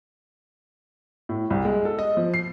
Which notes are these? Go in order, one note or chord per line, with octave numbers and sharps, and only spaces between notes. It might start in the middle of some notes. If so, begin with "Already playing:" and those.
A2
C2
G#3
A4
D#5
F3
C7